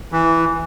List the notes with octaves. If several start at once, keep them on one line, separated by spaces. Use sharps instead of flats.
E3